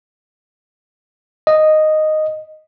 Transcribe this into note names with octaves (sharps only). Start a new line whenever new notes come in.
D#5